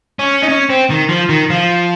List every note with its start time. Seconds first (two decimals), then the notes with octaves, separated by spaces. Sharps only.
0.19 C#4
0.43 D#4
0.49 C#4
0.69 C4
0.90 D#3
1.09 F3
1.29 D#3
1.50 F3